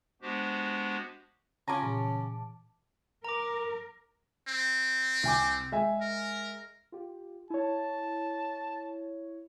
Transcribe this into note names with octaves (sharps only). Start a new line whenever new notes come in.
G#3 B3 D4 F#4 G4 C5
C#3 C#4 F4 A5 A#5 D6
A#2 E3
A#4 A#5 D6
C4
C2 G#5 D6
G#3 E5 G#5
A#4
F4 G4
E4 C#5 A5